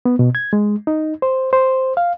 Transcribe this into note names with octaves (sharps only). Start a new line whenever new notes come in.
B3
B2
G#6
G#3
D#4
C5
C5
F5